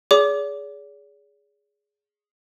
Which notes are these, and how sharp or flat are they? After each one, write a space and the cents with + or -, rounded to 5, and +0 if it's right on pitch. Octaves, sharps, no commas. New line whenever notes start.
G#4 +0 D5 -45 D6 +0